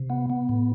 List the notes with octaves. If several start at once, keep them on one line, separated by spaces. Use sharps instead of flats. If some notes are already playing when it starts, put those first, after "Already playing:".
Already playing: C3
B3
B3
A2